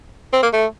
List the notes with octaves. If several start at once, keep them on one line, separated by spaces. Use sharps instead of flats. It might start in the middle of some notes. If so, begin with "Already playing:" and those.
C4
A#3
A3